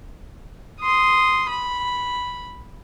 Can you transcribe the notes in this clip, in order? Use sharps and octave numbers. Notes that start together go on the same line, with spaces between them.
C6 D#6
B5